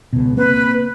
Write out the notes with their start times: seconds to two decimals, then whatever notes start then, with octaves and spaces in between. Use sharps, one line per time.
0.13 C#2 B2
0.37 A#3 C4 B4